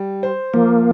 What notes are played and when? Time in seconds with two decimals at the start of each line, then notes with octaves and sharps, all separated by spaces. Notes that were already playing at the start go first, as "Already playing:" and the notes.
Already playing: G3
0.23 C5
0.54 F3 A#3